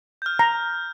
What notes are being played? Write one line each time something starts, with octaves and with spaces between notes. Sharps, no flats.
F6 G6
A#5